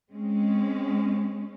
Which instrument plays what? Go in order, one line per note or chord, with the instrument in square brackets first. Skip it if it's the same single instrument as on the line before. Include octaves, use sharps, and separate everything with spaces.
[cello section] G#3 C4 C#4